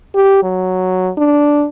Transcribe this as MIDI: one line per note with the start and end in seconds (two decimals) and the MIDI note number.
0.15 0.41 67
0.43 1.11 54
1.18 1.65 62